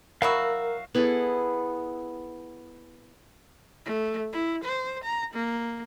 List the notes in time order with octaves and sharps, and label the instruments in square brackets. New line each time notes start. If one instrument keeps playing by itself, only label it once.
[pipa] F#3 E4 F#4 [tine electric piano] A#4 [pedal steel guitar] F5 E6
[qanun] B3 E4 G#4 A4
[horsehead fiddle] A3
E4
C5
A#5
A#3